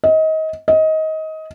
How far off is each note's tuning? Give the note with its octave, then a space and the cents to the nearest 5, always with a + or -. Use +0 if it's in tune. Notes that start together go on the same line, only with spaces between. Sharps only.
D#5 +25
D#5 +20